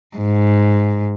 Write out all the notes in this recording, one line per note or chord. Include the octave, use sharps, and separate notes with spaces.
G#2